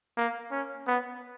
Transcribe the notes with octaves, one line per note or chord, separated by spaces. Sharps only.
A#3
C#4
B3